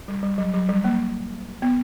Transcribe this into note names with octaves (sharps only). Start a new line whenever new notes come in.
G3
G3
F#3
F#3
G3
A#3
B3